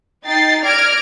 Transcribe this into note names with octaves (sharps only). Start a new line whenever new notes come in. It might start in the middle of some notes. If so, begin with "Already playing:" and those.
D#4 G5 A6 C7
D5 F6 G#6 A#6 D7